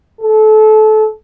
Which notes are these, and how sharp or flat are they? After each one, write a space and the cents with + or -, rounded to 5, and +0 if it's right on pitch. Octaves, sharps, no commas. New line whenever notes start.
A4 -25